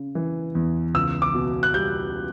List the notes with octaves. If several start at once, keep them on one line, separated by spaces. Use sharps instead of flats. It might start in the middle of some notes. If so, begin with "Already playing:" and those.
Already playing: C#3
E3
E2
C#2 E6
D6
B2
F#6
G3 G6